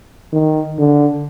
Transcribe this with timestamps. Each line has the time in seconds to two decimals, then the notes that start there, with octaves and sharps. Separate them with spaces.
0.32 D#3
0.78 D3